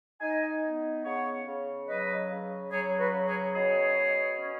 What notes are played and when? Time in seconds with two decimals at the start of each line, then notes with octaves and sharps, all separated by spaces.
0.20 D#4 D#5 G#5
0.62 B3
1.04 C#3 C#5 F#5
1.46 C#3
1.87 F#3 B4 D#5
2.29 C#3
2.70 F#3 G#4 C#5
2.98 F#4 B4
3.13 C#3
3.26 G#4 C#5
3.54 B2 G#4 C#5
3.96 B2
4.37 C#4